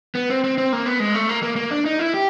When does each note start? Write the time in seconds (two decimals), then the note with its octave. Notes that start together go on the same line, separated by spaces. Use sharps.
0.15 B3
0.30 C4
0.44 C4
0.58 C4
0.73 A#3
0.86 B3
1.00 G#3
1.15 A3
1.29 A#3
1.43 A#3
1.56 A#3
1.71 D4
1.85 D#4
1.99 E4
2.14 G4